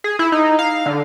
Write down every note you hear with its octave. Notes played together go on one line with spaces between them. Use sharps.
G#4
E4
D#4
F5
D3